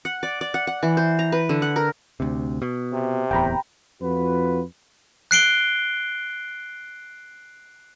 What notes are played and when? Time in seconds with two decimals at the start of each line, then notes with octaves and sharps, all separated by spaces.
0.05 F#5
0.23 D5
0.41 D5
0.54 F#5
0.67 F#5
0.83 E3
0.97 C5
1.19 A#5
1.32 B4
1.49 D3
1.62 F#5
1.76 A#4
2.20 D2 C3
2.62 B2
2.93 C3
3.31 D1 E2 G5 A#5 B5
4.01 F2 F4 F#4 B4
5.31 F#6 C7 D7 G7